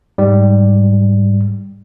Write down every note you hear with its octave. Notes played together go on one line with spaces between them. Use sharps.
G#2 G3